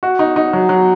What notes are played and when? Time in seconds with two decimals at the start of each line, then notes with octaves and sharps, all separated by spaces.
0.03 F#4
0.19 D#4
0.36 D#4
0.53 F#3
0.69 F#3